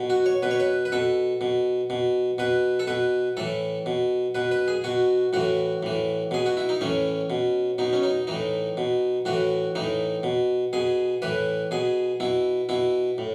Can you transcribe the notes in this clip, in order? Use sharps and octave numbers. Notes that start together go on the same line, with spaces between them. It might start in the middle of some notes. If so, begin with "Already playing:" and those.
Already playing: B2
F#4
C#5
B2 B4
C#5
B4
B4
B2 A4
B2
B2
B2 B4
A4
B2 B4
A2 E3 A4
B2
B2 B4
B4
G#4
B2 F#4
A2 E3 F#4
A2 E3
B2 G#4
F#4
E4
D#4
A2 E3 C#4
B2
B2 D#4
C#4
D#4
A2 E3 D#4
B2
A2 E3 F#4
A2 E3 D#4
B2
B2 G#4
A2 E3 B4
B2 G#4
B2 E4
B2 E4
A2